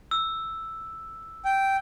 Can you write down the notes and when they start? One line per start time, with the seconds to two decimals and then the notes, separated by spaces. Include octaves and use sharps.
0.11 E6
1.45 G5